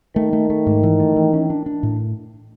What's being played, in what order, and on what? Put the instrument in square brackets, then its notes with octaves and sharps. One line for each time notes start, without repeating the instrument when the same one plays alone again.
[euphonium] D#3 [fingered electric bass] A3
[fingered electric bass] A3
A3
G#2
E3
A3
E3
C#4
D4
D4
A2